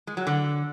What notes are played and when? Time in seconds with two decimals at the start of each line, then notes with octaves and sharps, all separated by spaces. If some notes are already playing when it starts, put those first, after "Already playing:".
0.07 G#3
0.17 F#3
0.27 D3